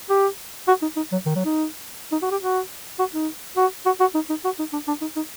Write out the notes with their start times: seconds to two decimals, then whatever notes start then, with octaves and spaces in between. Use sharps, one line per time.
0.10 G4
0.68 F#4
0.82 D#4
0.96 D#4
1.12 F#3
1.26 D#3
1.36 F#3
1.45 D#4
2.12 D#4
2.22 F#4
2.31 G4
2.42 F#4
2.99 F#4
3.14 D#4
3.57 F#4
3.86 F#4
4.00 F#4
4.15 D#4
4.29 D#4
4.44 F#4
4.59 D#4
4.73 D4
4.88 D4
5.01 D#4
5.16 D#4